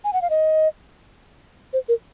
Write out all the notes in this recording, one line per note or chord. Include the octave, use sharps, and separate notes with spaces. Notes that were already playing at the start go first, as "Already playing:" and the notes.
G#5
F#5
F5
D#5
C5
A#4